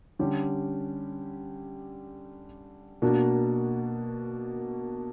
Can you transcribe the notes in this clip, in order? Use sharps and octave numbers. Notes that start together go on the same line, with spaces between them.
D3 G3 C#4 G4
B2 A#3 D4 F#4